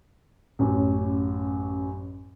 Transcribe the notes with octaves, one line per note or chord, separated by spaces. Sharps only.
A1 F#2